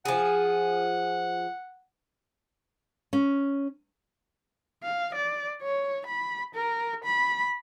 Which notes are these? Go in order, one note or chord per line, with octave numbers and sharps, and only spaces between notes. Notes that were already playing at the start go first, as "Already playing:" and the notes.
F3 G#4 F#5
C#4
F5
D5
C#5
B5
A#4
B5